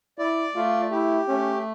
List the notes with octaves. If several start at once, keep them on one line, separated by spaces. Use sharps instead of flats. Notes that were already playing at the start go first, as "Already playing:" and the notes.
E4 D5
A3 F4
E4 G4
A3 C#4